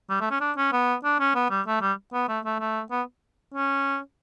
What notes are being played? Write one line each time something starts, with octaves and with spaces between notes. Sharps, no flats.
G3
A3
C#4
D4
C#4
B3
D4
C#4
B3
G3
A3
G3
B3
A3
A3
A3
B3
C#4